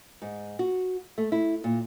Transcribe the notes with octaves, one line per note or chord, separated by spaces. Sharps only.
G#2
F#4
A3
E4
A#2